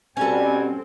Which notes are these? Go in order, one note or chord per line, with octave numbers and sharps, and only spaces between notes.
B2 G3 C4 C#4 A4 G#5